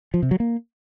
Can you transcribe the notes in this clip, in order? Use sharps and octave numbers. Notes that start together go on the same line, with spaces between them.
F3
C3
F#3
A#3